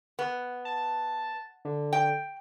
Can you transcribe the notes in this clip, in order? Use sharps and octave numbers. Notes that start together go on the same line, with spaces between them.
B3
A5
D3
G5